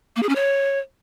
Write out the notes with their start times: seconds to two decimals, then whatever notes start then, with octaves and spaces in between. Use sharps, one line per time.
0.16 A#3
0.23 G#4
0.29 C#4
0.36 C#5